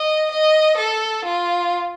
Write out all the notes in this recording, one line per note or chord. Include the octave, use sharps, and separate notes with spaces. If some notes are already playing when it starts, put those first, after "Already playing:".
Already playing: D#5
D#5
A4
F4